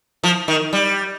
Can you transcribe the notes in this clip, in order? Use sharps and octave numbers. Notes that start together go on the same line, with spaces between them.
F3
D#3
G3